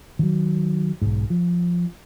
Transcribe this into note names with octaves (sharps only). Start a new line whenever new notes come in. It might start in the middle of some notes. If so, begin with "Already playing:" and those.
D#3 F#3
B1 G#2
F3